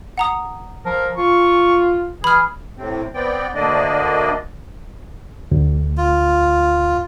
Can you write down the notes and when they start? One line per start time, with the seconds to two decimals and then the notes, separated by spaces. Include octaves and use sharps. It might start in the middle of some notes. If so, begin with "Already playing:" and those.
0.18 F#5 A#5 D#6
0.86 F3 A#4
1.17 F4 C#6
2.24 E3 G#4 B5 F6
2.78 A2 C3 C4
3.14 B3 C4 D5 G5
3.55 D2 D3 A#3 D4 D5 D#5
5.52 D2
5.98 F4